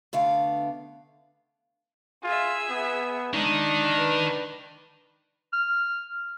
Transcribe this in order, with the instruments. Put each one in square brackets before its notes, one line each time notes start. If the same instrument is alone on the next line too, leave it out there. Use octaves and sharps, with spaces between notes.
[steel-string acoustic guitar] D3 A3 B3 F5
[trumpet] F4 [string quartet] G#4 E5
[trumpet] B3
[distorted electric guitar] D#3 D#4 [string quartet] G#3 [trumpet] D4
[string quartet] B4
[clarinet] F6